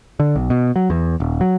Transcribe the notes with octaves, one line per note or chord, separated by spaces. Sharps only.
D3
B1
B2
F#3
E2
D#1
F#3